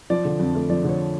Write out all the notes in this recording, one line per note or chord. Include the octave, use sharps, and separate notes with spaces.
F3 D5
D3
F2
A3
F3 D5
D3 C#5